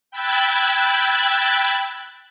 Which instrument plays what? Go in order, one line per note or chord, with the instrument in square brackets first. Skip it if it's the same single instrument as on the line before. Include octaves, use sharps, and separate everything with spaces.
[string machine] G5 B5 E6 F#6 G#6 A6